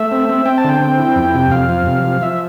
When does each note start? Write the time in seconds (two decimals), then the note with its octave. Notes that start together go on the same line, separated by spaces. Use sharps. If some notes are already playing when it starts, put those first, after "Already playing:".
Already playing: A3 E5
0.12 C4
0.29 C4
0.45 C4 G5
0.58 A5
0.64 D3 G5
0.81 C4
0.99 E4
1.16 F2
1.34 C3
1.51 F2 F5
1.69 F3
1.86 C3
2.04 F3
2.21 F3 E5